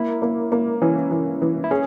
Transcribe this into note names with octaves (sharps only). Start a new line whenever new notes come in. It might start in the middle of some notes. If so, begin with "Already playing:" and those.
Already playing: A#3 E4
A#3
A#3
E3 C#4
E3
E3
E4
C#4 G#4